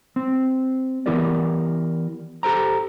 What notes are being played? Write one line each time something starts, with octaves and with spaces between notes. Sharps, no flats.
C4
E3 B3 E4 G4 A#4 D5
G4 A4 C5 A#5